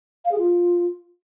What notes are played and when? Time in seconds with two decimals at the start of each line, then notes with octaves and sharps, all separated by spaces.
0.25 F5
0.32 G#4
0.38 F4